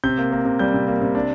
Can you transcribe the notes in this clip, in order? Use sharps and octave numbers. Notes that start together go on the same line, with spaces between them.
C3 G6
A#3
A#3
C3
G3 G6
C3
A#3
C3
D4